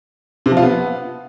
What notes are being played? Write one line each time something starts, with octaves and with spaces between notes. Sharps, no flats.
C3
F3
F4
B3